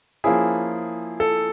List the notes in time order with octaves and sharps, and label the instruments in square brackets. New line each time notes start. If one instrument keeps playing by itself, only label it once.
[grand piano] F3 A#3 C#4 E4 G#4
A4